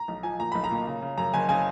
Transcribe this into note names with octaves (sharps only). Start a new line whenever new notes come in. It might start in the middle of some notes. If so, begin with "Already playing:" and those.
Already playing: A#5
B1
F3 G#5
A#2 A#5
B1 B5
A#5
A#2
C#3
C#3
F#2 A#5
F#1 G#5
C#3 G#5